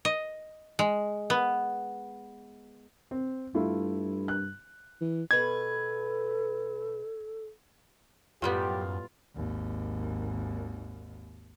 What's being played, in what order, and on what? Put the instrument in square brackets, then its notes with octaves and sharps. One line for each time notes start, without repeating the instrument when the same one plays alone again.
[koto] D#5
G#3
B3
[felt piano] C4
[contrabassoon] G2 [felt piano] A3 E4 F4
[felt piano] F#6
[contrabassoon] E3
[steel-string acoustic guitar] B2 B4 [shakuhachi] A4 [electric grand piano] G#6
[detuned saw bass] F#2 [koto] A2 G3 B3 [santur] F4 [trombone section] G4
[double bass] G#1 D#2